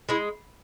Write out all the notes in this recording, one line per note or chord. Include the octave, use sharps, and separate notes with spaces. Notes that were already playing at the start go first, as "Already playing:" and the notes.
G#3 E4